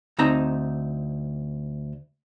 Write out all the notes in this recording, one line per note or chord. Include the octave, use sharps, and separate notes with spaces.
D2 C4 D#4 A#5